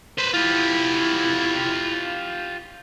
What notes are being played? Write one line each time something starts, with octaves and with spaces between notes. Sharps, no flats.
B4 C5
E4 F4 G4